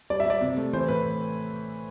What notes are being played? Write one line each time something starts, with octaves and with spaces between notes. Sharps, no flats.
G3 D5
E5
G3 D5
C3
A3
E3 C5
A2 B4